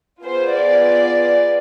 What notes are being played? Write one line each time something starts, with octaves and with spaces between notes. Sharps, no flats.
B3 F4 G#4 C5
D5